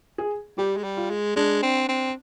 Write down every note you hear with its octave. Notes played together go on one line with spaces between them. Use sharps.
G#4
G3 G4
G#3
G3
F4
G#3
G#3 D4
C4
C4